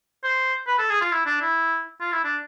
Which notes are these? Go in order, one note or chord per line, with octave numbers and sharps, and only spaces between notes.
C5
B4
A4
G#4
F4
E4
D4
E4
F4
E4
D4